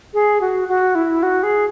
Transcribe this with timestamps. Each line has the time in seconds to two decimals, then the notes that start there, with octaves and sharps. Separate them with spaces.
0.14 G#4
0.41 F#4
0.69 F#4
0.95 E4
1.23 F#4
1.43 G#4